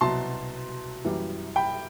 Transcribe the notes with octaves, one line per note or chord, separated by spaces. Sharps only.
C2 B2 F#3 A5 C6
F#2 E3 G3
G5 B5